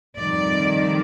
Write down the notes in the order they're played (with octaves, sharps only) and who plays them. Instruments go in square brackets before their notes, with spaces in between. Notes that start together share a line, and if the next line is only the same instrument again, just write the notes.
[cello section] F2 D#3 G3 D5